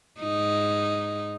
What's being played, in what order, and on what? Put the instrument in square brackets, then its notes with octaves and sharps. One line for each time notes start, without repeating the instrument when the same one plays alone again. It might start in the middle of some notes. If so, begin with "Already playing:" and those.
[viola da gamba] G#2 D#4